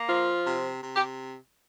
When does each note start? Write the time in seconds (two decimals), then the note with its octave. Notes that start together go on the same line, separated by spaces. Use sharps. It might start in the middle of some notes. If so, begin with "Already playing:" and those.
Already playing: A#3
0.08 F3 F4
0.46 C3
0.83 C3
0.96 G4